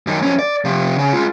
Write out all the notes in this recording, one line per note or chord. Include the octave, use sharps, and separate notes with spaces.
F#2 D#3
F2 C#4
D5
C3 F3
C#3
G#3 F4